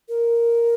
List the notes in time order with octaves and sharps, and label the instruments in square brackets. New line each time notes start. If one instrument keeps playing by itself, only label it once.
[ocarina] A#4